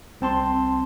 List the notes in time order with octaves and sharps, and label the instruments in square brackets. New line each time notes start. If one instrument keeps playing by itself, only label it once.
[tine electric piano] C2 C4 A5 C6